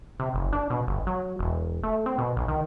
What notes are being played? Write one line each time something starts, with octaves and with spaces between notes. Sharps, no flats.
C3
F#1
D4
B2
G1
F#3
E1
A3
C4
B2
B1
D#3